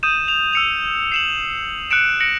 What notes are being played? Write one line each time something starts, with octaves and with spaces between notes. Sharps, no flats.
D#6 G6 D#7 E7
F7
E6 C#7 F7
C7 E7 F#7
F#6 C#7 D7 E7
A#6 C#7 D7 F#7